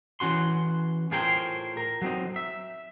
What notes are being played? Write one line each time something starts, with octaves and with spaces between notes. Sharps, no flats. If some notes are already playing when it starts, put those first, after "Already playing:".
E3 C#4 F#4 C6
A2 F4 G#4 A#4 C5 G5
A#4
F#3 C4 D#4
E5